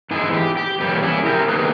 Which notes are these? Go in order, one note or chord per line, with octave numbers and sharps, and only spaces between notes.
G#2 E3 G#3 D#4 E4 G#4
G4
G4
E2 B2 G3 A#3 C#4 G4
E4 G#4
G4 A#4
D#3 A#3 D#4 G#4 B4